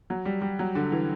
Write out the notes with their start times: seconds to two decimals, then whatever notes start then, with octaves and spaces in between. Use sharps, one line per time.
0.10 F#3
0.25 G3
0.42 G3
0.59 F#3
0.75 D3
0.92 E3